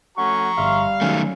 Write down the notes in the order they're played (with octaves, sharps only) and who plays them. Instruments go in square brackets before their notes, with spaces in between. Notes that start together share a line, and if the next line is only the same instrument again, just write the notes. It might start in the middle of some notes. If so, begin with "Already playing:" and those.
[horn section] A3 C#4 F#4 [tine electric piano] F#5 [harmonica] A#5 C#6
[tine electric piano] G1 E5 C6 [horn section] G3 F5
[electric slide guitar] D#3 A3 [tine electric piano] F#3 C#4